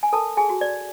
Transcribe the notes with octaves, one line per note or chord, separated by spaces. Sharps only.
G#5
A4 A#4 A5
G#4 G#5
F#4
D5